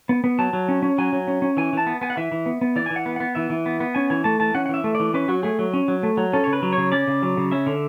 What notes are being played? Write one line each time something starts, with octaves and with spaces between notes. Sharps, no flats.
B3
B3
F#3 A5
F#3
C#4
C#4
F#3 G#5
F#3
C#4
C#4
E3 G#5
E3 A5
B3
B3 G#5
F#5
E3 E5
E3
B3
B3
E3 D5
G#5
E3
F#5
B3
B3 F#5
E3 E5
E3
B3
B3
C#4 G#5
E3 G#5
A3 A5
E3 A5
C#4 F#5
F#5
E3 E5
A3
D5
E3
C#4 B4
F#3 F#4
A3 G#4
F#3
C#4
F#3
A3
F#3
C#4 A4
C#3 C#5
B4
F#3
C#3 C#5
C#4 D5
C#3
F#3
C#3
C#4 E5
D3